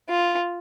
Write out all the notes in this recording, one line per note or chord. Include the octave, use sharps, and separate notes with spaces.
F4